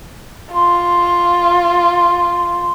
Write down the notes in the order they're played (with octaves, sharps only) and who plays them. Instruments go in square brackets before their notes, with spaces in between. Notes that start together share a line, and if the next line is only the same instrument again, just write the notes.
[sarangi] F4 [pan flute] C6